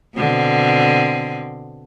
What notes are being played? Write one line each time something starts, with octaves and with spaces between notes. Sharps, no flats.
B2 D3 C4